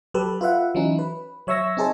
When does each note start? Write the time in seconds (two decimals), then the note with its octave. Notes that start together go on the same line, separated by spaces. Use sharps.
0.14 F#3 G4 A4 B4
0.41 F4 B4 E5 F#5
0.75 E3 F#3 C#4 D#4 E4
0.99 B4
1.47 F#3 C#5 E5 C#6 E6 A#6
1.77 C4 D#4 G#4 A4 C5 C#5